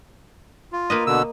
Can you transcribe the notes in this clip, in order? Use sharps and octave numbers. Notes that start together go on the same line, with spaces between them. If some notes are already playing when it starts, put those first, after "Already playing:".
F4
A#3 B4 D#5
B2 D3 E6